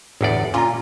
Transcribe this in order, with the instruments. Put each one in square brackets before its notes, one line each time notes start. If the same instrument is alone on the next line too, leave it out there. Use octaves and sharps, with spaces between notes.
[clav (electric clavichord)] G1 E2 D5 [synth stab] A2
[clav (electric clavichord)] A#2 [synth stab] C#4 F4 [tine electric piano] G#5 A#5